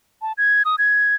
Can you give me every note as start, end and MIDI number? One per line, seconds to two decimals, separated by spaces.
0.22 0.33 81
0.38 0.63 92
0.65 0.76 87
0.78 1.15 92